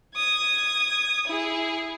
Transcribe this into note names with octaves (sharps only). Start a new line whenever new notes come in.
D#6 G#6
E4 G#4